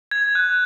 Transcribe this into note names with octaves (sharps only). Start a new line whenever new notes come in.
G#6
F#6